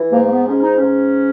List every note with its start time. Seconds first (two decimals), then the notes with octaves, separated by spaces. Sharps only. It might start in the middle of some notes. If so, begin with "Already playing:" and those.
Already playing: E3
0.11 G#2 A#3
0.24 A#3
0.29 B3
0.47 G#2 C#4
0.61 D#4
0.74 C#4
0.82 G#2